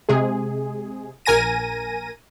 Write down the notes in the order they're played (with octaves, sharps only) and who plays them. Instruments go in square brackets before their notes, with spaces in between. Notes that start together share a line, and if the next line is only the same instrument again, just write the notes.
[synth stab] C3 G#3 G#4
A#1 A#4 G#5 A#6 D#7